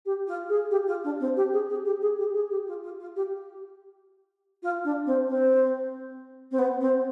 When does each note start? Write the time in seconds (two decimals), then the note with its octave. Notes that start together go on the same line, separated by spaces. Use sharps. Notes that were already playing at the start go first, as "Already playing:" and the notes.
0.05 G4
0.27 F4
0.49 G#4
0.71 G4
0.87 F4
1.04 D4
1.20 C4
1.36 G4
1.52 G#4
1.69 G#4
1.85 G4
2.01 G#4
2.18 G4
2.34 G#4
2.50 G4
2.67 F4
2.83 F4
3.00 F4
3.16 G4
4.63 F4
4.84 D4
5.06 C4
5.28 C4
6.51 C4
6.58 B3
6.80 C4